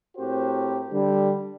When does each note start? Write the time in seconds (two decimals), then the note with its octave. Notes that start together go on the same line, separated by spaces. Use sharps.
0.18 A2 C4 F#4 G4 A#4 C5
0.92 D3 G3